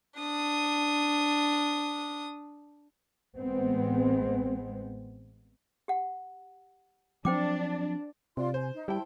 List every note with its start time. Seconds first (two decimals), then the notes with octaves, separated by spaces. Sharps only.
0.19 D4 D#6
3.36 A1 G#3 B3 C4
5.88 G4 F#5
7.25 F3 F#3 C4 D4 C5 G5 D6
8.37 C3 F4 D5 C6
8.54 C5 G#5
8.75 D#4
8.88 G3 E4 C5 G5 A5